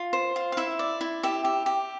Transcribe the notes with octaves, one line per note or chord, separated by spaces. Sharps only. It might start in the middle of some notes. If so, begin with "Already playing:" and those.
Already playing: F4
C5
F4
F5
E4 E5
D5
E4
G4 E5
G4
G4